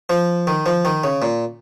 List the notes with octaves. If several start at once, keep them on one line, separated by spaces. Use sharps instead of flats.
F3
D#3
F3
D#3
C#3
A#2